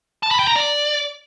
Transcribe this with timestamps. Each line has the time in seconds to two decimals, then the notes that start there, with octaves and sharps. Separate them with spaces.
0.23 A5
0.31 B5
0.39 G5
0.47 A#5
0.55 D5